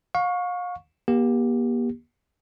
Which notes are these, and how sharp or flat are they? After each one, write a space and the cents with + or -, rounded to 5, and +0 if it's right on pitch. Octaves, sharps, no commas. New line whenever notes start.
F5 +35 C#6 +0
A#3 +40 G4 +5